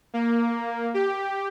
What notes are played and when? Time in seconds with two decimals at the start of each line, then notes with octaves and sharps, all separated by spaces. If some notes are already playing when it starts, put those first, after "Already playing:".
0.14 A#3
0.94 G4